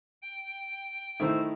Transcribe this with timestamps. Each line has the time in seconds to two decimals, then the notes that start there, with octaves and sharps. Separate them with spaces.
0.22 G5
1.20 D#3 A3 E4 C5